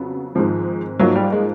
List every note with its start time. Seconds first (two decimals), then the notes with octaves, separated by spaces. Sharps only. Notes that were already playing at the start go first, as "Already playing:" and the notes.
Already playing: F2 C#3 F#3 B3
0.35 G#2 D#3 F3 G#3 C4
0.99 G#2 F3 F#3 A#3 D#4
1.15 G3
1.32 G#3